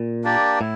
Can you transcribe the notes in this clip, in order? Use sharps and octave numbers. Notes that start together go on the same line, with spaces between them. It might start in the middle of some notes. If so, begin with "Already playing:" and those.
Already playing: A#2
A#3 D4 G4 D5
A2 E4